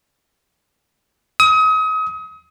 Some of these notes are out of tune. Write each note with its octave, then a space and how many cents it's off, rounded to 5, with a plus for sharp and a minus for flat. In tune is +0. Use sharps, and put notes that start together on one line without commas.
D#6 +35